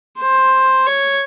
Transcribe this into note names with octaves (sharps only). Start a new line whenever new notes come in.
C5
C#5